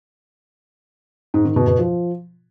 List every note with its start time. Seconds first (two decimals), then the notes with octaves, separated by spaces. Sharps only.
1.34 G#2
1.45 D#3
1.56 B2
1.67 B2
1.78 F3